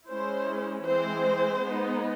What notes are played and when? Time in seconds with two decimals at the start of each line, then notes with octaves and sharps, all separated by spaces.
0.09 G#3 C#4 E4 C5
0.86 E3 G#3 C4 C5
1.63 G#3 B3 D#4